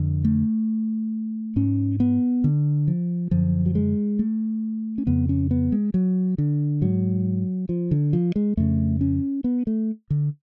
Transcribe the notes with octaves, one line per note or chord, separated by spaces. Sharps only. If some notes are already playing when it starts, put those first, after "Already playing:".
Already playing: F2 D3
A3
G#2 C#4
B3
D3
F3
F#2 D3 F3
F#3
G#3
A3
C#4
F2 C#3 B3
C#4
B3
G#3
F#3
D3
G#2 F#3
F3
D3
F3
G#3
F2 C#3 A3
C#4
B3
A3
D3